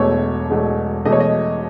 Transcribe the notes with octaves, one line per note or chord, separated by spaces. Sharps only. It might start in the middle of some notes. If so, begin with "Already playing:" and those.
Already playing: E1 E2 B2 A3 C#5
E1 E2 B2 A3
E1 E2 B2 A3 D#5
C#5
D#5